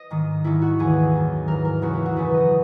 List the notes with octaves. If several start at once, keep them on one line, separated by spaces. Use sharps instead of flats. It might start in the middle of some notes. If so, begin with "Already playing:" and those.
Already playing: D#5
G#2 D#3
G#2 D#3 E4
F#4
D#2 C#3 E3 G#4
F#2 D#3
G#2 E3 A#4
A#4
D#2 C#3 E3 F#4
E4
F#4
F#2 C#3 E3 B4
D#5